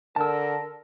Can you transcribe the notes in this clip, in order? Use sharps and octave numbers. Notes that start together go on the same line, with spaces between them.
D3 A#4 A5 E6